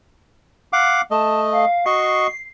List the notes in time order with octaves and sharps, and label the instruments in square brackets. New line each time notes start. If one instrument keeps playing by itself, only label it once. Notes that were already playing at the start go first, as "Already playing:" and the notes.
[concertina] F5 F#5 D6
[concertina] A3 D#5 [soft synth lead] A5
[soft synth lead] F5
[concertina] F#4 D#5 C#6 [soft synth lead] C7